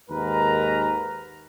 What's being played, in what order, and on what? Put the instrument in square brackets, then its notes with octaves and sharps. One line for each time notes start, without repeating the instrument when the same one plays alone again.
[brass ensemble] D#2 G#2 A#4 B4 A#5